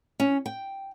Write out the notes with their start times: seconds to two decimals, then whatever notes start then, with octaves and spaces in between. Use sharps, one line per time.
0.20 C#4
0.46 G5